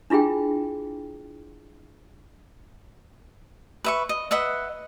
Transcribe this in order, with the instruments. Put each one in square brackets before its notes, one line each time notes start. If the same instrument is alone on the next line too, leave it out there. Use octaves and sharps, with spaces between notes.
[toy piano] D4 E4 F4 G#4 G5
[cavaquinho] B4 E5 C#6
D#5
B4 D#5 E5 F#5